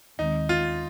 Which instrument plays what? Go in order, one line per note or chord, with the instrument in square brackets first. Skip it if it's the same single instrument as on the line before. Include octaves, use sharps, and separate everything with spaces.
[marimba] D#2 D#3 G#3 C4 [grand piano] D#4
[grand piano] F4